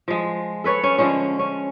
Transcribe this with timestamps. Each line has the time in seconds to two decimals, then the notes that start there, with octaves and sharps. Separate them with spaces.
0.08 F3 G#3
0.64 A4 B4 C#5
0.83 C#4
0.98 D3 F3 G#3 C#4
1.39 C#4